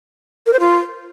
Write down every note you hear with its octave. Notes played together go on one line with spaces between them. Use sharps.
A#4
C5
F4